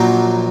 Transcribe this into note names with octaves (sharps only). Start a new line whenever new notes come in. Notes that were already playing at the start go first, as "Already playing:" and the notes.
Already playing: A#1 A#2 F#3